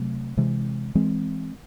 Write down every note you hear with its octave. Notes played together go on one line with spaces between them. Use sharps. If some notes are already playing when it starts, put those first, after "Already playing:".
Already playing: C3 F#3 A3
C3 E3 G#3
E3 G#3 C4